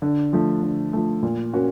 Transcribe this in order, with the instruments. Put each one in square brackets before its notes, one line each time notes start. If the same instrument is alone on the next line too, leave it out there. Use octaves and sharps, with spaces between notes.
[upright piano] D3
F3 A3
D3
F3 A3
A#2
A#3 C#4 F#4